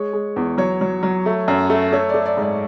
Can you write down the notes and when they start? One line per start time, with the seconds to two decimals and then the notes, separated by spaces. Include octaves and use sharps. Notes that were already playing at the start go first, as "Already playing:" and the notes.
Already playing: G#3 C#5
0.13 G#3
0.36 E2
0.58 F#3 C#5
0.81 F#3
1.03 F#3
1.26 A3
1.48 F#2
1.70 A3
1.92 A3 C#5
2.09 D5
2.14 A3
2.26 D5
2.37 G#2
2.42 D5